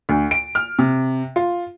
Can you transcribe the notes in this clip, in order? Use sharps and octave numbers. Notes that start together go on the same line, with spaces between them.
D2
D7
F6
C3
F4